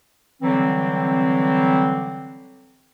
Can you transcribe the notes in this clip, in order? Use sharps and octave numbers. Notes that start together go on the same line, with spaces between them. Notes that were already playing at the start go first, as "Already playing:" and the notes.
D3 E3 F#3 G3 C4